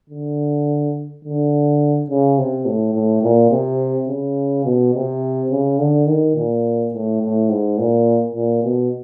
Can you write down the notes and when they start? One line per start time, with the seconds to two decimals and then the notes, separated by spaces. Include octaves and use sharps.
0.10 D3
1.25 D3
2.09 C#3
2.38 C3
2.66 A2
2.95 A2
3.23 A#2
3.51 C3
4.09 C#3
4.65 B2
4.94 C3
5.51 C#3
5.79 D3
6.07 D#3
6.36 A#2
6.93 A2
7.21 A2
7.50 G#2
7.79 A#2
8.35 A#2
8.64 B2